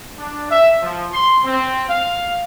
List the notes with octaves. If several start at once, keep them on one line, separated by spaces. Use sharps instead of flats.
D4
E5
F3
C6
C4
F5